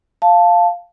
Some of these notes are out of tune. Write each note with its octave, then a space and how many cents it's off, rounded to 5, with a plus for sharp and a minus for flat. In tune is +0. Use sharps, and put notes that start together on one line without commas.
F5 +0 A5 +0